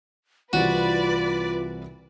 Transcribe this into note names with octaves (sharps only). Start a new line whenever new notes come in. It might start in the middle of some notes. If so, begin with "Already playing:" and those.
C2 E3 C4 F4 F#4 B4 D5